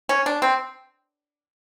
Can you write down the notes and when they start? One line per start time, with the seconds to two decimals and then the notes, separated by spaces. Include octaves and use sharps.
0.09 C#4
0.26 D4
0.42 C4